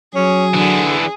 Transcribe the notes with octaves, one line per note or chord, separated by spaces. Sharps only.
F#3 C#4 G#4
D3 E3 D4